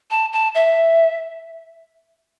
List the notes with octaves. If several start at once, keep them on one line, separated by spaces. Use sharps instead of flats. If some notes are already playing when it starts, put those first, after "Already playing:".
A5
A5
E5